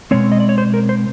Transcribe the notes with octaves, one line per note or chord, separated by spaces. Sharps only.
B2 G#3 C4 C#5
D#5
D5
C#5
C5
A#4
C5